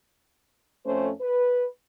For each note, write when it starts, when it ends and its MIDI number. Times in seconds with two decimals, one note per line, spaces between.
0.86 1.11 41
0.86 1.11 57
0.86 1.11 61
0.86 1.11 72
1.21 1.66 71